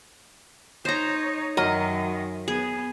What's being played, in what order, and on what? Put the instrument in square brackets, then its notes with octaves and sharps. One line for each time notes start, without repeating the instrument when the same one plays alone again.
[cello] D#4 C#5 [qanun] C5 A#5
[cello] F#2 D#3 [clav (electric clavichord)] F#3 A#4 [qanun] D#5
[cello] B3 [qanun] G#4